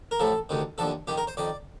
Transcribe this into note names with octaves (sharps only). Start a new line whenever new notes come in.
A#4
A1 A2 F3 A4
D2 C3 D#3
D#2 D3 F3 A4
F2 D#3 G4
A#4
C5
F2 D#3 D5